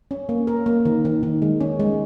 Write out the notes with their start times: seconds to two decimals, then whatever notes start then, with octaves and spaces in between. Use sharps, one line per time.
0.11 C#4
0.29 A#3
0.47 A#4
0.66 A#3
0.85 D#3
1.05 D#3
1.23 D#3
1.42 G#3
1.61 C#4
1.80 G#3